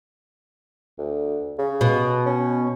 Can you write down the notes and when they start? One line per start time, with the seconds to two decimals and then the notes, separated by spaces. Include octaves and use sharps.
0.98 D2
1.59 C#3
1.81 B2
2.26 C#4